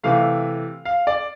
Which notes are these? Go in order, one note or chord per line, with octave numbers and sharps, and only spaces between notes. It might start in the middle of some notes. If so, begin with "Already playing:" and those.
C3 E3 A3 F5
F5
D5